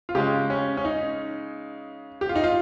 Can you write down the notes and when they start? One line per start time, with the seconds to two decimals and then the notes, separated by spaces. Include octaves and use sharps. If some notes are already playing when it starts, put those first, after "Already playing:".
0.09 F4
0.15 C#3 G#3 G4
0.50 C#4
0.77 C#4
0.85 D#4
2.21 G4
2.29 F4
2.36 D#4
2.44 F4